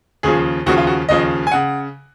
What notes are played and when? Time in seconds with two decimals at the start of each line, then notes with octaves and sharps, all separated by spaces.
0.23 D#2 C#3 F3 G#4
0.66 D#2 C#3 F3 F#4
0.78 F4
0.87 F#4
1.09 D#2 C#3 F3 D#5
1.47 G#5
1.52 C#3 F#5